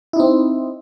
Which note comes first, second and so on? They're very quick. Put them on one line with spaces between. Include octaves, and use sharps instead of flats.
E4 D#4 C4